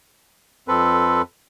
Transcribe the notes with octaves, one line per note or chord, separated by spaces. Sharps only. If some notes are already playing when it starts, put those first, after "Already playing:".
F2 C4 A4 B4